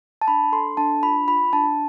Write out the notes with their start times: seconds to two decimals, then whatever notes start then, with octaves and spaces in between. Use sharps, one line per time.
0.22 A5
0.28 D4 B5
0.52 A4 C6
0.77 D4 A5
1.03 F4 B5
1.28 F4 B5
1.53 D4 A5